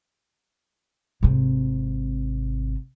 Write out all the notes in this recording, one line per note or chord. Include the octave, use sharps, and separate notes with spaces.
G#1 C3